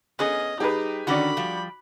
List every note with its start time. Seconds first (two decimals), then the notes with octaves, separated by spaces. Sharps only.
0.19 B3 C#4 G#4 D#5
0.60 G3 D#4 G4 G#4 B4
1.07 D3 D#3 C#4 F#4 D5 B5
1.37 F3 G3